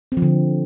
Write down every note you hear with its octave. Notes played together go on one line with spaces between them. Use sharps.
C4
F3
D3